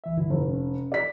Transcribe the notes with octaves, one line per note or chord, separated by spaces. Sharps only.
C2 E3 E5
G2 D3 E4
F1
C#4
D5 B6